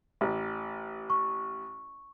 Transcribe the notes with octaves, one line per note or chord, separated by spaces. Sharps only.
A1
C#6